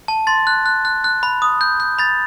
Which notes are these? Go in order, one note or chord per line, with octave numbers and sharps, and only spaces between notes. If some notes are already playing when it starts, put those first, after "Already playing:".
A5
C6 A6
F#6
F#6
F#6
F#6
B5
D#6
G6
G6
B5 A6